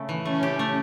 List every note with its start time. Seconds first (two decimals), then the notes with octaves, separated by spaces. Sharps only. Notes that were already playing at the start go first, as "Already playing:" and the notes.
Already playing: C#3 A3
0.09 E3
0.25 A3 C#4
0.43 G4
0.59 A3